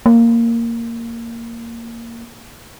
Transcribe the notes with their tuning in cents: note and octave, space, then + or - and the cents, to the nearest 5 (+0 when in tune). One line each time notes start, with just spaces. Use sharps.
A#3 -10